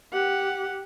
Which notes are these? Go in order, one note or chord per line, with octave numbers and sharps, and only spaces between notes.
G4 F#5